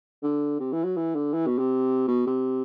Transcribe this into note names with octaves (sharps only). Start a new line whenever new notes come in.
D3
C3
E3
F#3
E3
D3
E3
B2
C3
B2
C3